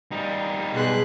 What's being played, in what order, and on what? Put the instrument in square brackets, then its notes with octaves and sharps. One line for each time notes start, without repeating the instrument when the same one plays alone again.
[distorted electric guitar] G3 D#4
[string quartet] B2 C6 F#6 [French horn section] G#4